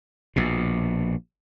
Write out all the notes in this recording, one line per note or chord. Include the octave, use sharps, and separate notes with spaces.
A#1 B2